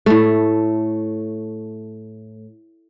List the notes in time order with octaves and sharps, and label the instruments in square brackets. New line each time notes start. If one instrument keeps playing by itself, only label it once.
[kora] A2 A3